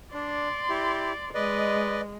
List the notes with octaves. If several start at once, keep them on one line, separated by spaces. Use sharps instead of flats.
D4 D5 C6
E4 G4
G#3 B4 D5 D#5